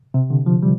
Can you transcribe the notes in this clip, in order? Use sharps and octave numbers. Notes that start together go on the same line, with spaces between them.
C3
D3
F3
G3